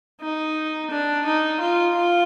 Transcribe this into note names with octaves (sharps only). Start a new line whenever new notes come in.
D#4
D4
D#4
F4
F4